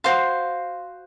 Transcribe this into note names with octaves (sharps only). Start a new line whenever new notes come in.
F#4 C5 F5 C6